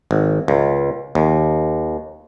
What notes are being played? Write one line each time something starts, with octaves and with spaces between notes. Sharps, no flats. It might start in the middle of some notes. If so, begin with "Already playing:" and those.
G#1
C#2
D#2